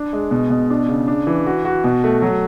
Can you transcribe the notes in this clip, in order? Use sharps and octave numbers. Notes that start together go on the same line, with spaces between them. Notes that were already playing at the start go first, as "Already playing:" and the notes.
Already playing: D4
G#3
B2
B2
D4
C#3
D4
E3
F#4
F#4
B2
A3
F#3